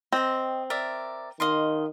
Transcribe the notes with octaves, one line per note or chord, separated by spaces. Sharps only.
C4 D#5 G5
A#4 D5 E5
D#3 D#5 F5 C6